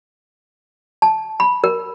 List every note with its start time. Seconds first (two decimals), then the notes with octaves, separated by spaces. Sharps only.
1.02 A5
1.40 B5
1.64 A#4